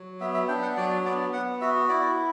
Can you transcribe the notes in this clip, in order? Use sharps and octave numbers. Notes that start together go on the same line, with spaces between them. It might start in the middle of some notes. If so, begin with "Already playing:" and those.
Already playing: F#3
B3 E5
E5
D4 G5
F#5
F#3 D5
B3 D5
B3 F#5
F#4 E5
E4 D5